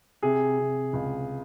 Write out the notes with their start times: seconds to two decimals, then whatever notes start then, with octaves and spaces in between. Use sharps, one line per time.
0.22 C3 G#4
0.59 C3
0.93 C#2